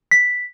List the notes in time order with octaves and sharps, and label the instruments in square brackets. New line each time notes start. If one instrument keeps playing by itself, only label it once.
[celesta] B6